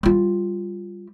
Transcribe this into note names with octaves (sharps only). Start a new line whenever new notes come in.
G3 F4